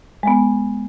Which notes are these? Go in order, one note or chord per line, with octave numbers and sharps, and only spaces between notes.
G#3 B3